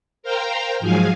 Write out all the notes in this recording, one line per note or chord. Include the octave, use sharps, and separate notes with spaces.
A#4 C5 F5 G5 A#5
G#2 F3 F#3 G#3 F5 G#5